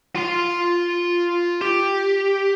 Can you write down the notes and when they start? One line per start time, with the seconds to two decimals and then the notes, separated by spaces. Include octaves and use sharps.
0.16 F4 C6
1.62 G4